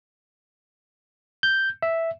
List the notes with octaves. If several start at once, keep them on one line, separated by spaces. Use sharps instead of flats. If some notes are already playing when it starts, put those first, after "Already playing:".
G6
E5